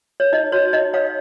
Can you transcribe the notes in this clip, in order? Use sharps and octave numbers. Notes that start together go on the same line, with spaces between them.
C#5
D#4 D#5
F#4 C#5
D#4 D#5
C#5 F5